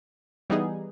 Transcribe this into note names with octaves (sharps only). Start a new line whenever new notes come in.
E3 G3 B3 D#4 G#4